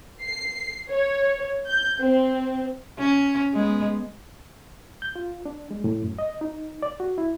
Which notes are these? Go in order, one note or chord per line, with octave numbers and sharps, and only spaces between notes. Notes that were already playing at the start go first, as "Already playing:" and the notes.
C7
C#5
G6
C4
C#4
G#3 B3
G6
F4
D4
G#3
A2
F#2
D#5
D#4
D5
F#4
E4